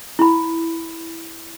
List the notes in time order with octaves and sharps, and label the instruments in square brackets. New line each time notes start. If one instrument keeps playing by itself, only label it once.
[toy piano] E4 B5